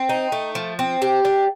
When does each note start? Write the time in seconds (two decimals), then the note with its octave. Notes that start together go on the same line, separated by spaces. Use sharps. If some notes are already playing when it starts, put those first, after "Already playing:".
Already playing: C4
0.09 D#4
0.32 A3
0.55 F3
0.79 C4
1.02 G4
1.25 D4